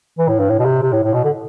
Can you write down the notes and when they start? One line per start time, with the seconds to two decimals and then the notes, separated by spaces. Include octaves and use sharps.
0.18 E3
0.28 A2
0.39 G2
0.49 A2
0.59 B2
0.65 C3
0.82 C3
0.92 A2
1.03 A2
1.13 B2
1.24 D3